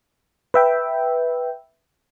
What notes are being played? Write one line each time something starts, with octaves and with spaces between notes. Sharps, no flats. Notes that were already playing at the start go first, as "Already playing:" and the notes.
B4 E5 G5